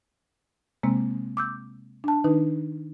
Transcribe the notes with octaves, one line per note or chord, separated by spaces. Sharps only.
C3 G#3 A#3 C4
D6 E6 G6
D4 A5
D#3 D4 D#4 B4